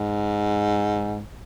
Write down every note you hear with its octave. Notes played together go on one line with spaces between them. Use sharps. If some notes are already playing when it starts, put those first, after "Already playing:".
Already playing: G#2